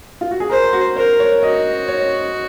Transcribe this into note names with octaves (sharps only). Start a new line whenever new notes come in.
F4
F#4
G#4
A#4 C5
F#4
A#4 C5
C#5
F#4 D#5
C#5